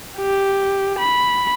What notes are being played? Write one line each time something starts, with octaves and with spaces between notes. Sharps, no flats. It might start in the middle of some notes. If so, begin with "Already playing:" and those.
G4
B5